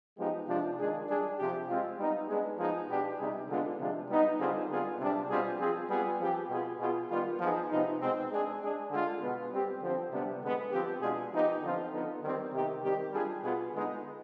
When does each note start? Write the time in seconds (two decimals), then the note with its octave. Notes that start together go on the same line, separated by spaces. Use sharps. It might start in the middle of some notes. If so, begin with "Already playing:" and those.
0.18 F3 G#3 B3 D#4 G4
0.48 C3 F3 G#3 D4 F4
0.78 D#3 G#3 D4 G#4
1.08 G3 D4 G#4
1.38 C3 F3 C4 G4
1.68 G#3 C4 F4
1.98 G3 B3 D#4
2.29 G#3 B3 D4 G#4
2.59 F3 G#3 B3 D#4 G#4
2.89 B2 B3 D4 G4
3.19 C3 G3 C4 D#4 G#4
3.49 D3 G#3 B3 D4 F4
3.79 C3 F3 G#3 D4 F4
4.09 G3 B3 D#4
4.40 D3 G3 C4 F4 G#4
4.70 D3 G3 B3 F4 G#4
4.99 C3 G3 D4
5.30 B2 G3 C4 F4 G#4
5.60 F3 C4 F4 G#4
5.90 G3 B3 F4 G#4
6.20 F3 C4 G4
6.50 B2 B3 F4 G#4
6.80 B2 B3 F4 G#4
7.10 D#3 G3 B3 F4
7.40 F3 B3 D#4 G#4
7.71 C3 F3 B3 D#4
8.01 B2 G#3 C4
8.31 G#3 D4 G#4
8.61 G#3 D4 G#4
8.91 D3 G#3 D4 F4 G#4
9.21 B2 G#3 B3
9.51 G3 C4 G4
9.81 D3 F3 C4
10.11 C3 G3 B3 D4 G4
10.42 D3 G#3 B3
10.72 F3 C4 G4
11.02 B2 G#3 D4 F4 G#4
11.32 F3 B3 D#4 G4
11.62 D3 F3 C4 F4
11.92 D3 F3 B3 D#4
12.22 D#3 G3 C4 G4
12.53 C3 D#3 B3 D#4 G4
12.83 D#3 G3 C4 G4
13.13 G3 D4 F4 G#4
13.43 B2 B3 F4 G#4
13.73 D3 G#3 B3 D#4